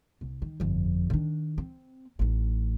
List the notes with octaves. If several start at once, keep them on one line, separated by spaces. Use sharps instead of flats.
C2
D#3
G1 F2
D#3 D4
C4
A1 D#4